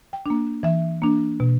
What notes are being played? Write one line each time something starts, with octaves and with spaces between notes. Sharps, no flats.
G5
A#3 D4
E3 E5
A#3 D4
B2